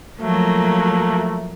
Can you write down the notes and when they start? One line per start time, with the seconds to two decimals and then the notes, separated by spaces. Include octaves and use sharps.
0.19 F3 F#3 A3 A#3